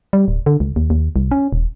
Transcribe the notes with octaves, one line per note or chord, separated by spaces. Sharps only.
G3
D1
D3
C#2
D#2
D#2
C2
C#4
D#1